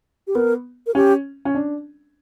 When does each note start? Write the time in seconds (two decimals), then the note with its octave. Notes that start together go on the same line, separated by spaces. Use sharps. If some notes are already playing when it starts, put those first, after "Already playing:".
0.27 G4
0.35 B3 A#4
0.87 A#4
0.95 C#4 G4
1.45 C#4
1.55 D4